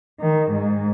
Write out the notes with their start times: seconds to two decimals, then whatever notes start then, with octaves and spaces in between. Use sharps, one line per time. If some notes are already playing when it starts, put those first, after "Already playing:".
0.19 D#3
0.52 G#2